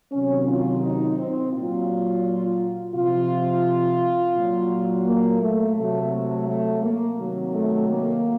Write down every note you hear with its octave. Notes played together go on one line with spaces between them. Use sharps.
C3 D#3 F#3 C#4
F4
D#4
C4
A#2 F#3 F4
C3 F3 F4
A#2 F#3
A#3
A3
C3 F#3 A3
A3
A3
A#3
C3 D#3 F#3
A3
A#3